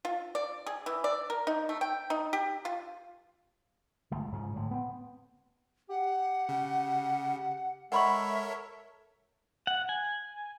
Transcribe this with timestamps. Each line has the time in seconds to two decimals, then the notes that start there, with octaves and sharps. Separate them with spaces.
0.05 F4
0.35 D5
0.67 G#4
0.86 E3
1.04 D5
1.30 A#4
1.47 D#4
1.69 A3
1.81 G5
2.10 D#4
2.33 G4
2.65 F4
4.11 G1 G#3 A3
4.32 G#2 C#3 F3
4.56 A2 D3 G#3
4.71 B3 C4
5.90 G4 F#5
6.49 C#3
7.92 G#3 A4 A#4 C#5 E5 F#5 B5 C#6
9.67 F#5
9.89 G#5